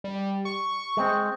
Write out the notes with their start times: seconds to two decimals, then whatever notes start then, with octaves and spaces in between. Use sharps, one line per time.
0.04 G3
0.45 C#6
0.97 G#3 C4